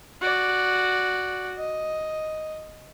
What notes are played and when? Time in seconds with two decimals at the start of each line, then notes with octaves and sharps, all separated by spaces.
0.21 F#4 D5
1.58 D#5